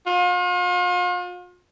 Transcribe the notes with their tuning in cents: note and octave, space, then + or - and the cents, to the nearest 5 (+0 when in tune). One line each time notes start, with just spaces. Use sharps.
F4 +40